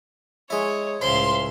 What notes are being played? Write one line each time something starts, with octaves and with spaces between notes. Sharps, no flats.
G#3 E4 C#5
C#2 A2 C5 E5 F5 C6